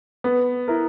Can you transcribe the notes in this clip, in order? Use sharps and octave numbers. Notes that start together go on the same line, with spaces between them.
B3
E4 A#4